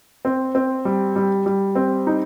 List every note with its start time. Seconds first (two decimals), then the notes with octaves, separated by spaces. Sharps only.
0.25 C4
0.55 C4
0.85 G3
1.16 G3
1.46 G3
1.75 C4
2.07 D#4